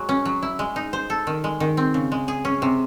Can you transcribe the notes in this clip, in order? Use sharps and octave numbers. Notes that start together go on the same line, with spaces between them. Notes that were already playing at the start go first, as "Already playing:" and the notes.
Already playing: F#3 G#3
C#4
F#3
E4
G#3
D#4
C5
A4
D#3
G#3
D#3
C4
C#3
G#3
G#4
C#4
C3